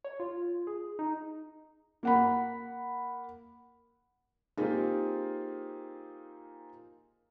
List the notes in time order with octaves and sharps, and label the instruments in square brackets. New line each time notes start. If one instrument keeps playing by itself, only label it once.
[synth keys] C#5
F4
G#4
D#4
[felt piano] A#3 F#5 B5
A#3 C4 D#4 F4 G4 G#4